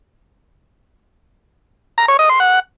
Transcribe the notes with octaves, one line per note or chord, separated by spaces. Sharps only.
A#5
C#5
D#5
C6
F#5